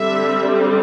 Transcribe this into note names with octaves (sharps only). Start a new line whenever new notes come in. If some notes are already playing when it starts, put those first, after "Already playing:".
Already playing: D3 G3 C4 E5